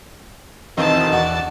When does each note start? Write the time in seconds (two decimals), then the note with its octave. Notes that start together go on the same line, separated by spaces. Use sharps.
0.78 F2 B2 D#3 E3 C4 D#4 A5
1.12 E2 D4 F#4